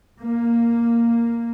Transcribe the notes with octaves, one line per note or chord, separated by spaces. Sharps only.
A#3